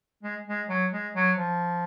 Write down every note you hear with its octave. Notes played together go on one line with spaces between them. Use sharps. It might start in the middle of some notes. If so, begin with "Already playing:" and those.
G#3
G#3
F#3
G#3
F#3
F3